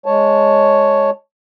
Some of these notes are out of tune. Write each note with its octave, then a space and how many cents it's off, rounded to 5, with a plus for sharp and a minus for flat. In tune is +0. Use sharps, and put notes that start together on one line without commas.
G#3 +0 C#5 +0 A5 +0